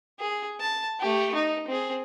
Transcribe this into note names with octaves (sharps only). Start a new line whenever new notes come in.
G#4
A5
A3 G4
D#4
C4 G#4